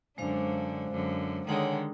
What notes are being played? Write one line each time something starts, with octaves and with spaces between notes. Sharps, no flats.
F#2 D3 G#3 D4 C5 F5
F#2 D3
D3 D#3 G#3 C#5 F#5 G#5